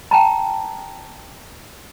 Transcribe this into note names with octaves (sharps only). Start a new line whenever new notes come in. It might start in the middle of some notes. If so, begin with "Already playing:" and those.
G5 A5 A#5